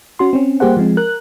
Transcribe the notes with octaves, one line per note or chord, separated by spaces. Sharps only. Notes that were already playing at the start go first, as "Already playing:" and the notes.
C#4 F#4 C6
C4 C#4
G3 A#3 G4 G#4 C5 F#5
F3 G#3 C4
A#4 F#6